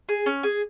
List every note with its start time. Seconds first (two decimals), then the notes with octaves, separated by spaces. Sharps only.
0.09 G#4
0.26 C#4
0.43 G#4